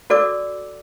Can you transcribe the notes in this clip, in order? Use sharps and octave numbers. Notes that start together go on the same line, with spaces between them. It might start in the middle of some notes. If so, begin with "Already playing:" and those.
F#4 A4 D5 D6 E6